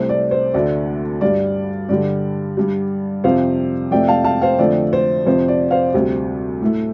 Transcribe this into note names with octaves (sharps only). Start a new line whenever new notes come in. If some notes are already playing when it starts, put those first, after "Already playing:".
Already playing: C2 C3 A3 C5
D5
C5
D2 D3 A3 D5
G2 G3 D5
G2 D3 G3 D5
G2 G3
F2 C3 F3 C5 F5
F2 C3 A3 D5 G5
F5 A5
F5 A5
C5 F5
F2 D3 F3 A3 D5
C5
F2 C3 F3 C5
D5
C5 F5
D2 C3 G3
A2 A3